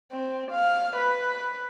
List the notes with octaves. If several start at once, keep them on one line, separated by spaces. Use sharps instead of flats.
C4
F5
B4